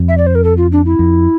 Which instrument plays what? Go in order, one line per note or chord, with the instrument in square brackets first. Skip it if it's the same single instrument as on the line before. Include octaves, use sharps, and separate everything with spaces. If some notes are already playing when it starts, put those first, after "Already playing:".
Already playing: [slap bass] F2
[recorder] E5
D5
C5
A#4
A4
F4
D4
E4
[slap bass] F2